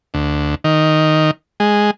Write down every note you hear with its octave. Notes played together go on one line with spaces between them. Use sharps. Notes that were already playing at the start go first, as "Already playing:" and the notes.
D2
D#3
G#3